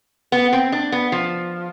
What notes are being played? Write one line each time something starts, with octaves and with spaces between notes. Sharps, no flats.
B3
C4
D4
B3
F3